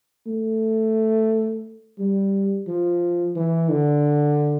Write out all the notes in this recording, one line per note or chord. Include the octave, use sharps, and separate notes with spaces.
A3
G3
F3
E3
D3